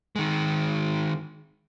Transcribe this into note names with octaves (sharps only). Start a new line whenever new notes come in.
D#3 G#3